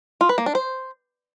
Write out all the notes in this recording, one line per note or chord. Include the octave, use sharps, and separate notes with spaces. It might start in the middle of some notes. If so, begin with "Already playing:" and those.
F4
B4
A#3
D4
C5